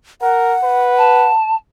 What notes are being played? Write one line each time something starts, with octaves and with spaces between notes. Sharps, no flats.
A#4 F#5
B4
A5